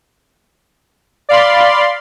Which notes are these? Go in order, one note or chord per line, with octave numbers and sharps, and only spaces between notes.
D5 F5 B5 C6